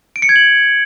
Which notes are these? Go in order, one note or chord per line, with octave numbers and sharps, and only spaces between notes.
D7
C#7
G#6
F#7